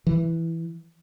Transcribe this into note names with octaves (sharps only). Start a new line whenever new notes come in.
E3